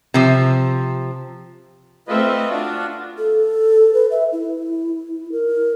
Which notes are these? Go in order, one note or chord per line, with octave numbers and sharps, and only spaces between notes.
C3 F3
A3 C4 F4 B4 D#5 E5
D4 F4 F#4
A4
B4
E5
E4
A#4